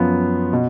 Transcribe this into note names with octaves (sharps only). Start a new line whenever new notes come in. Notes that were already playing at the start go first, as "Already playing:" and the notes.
Already playing: F#2 F3 B3 F4
B2